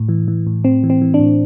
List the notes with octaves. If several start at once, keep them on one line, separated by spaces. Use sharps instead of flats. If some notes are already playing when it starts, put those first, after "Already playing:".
Already playing: A2
E3
E3
A2
A2 C4
E3
C4
E3
D4
A2